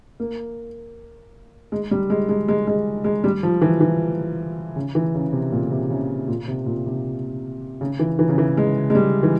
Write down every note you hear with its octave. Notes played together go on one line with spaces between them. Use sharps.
A#3
G#3
G3
G#3
G#3
G#3
G#3
G#3
G3
F3
E3
E3
C#3
E3
C#3
C3
A#2
C3
C#3
A#2
C3
A#2
C3
C#3
E3
E3
C#3
E3
G#3
G#3
G3
E3